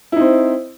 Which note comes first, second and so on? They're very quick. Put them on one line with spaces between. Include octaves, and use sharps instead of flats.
E4 D#4 C4